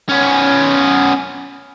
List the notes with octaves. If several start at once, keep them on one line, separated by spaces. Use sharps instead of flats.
B3 C#4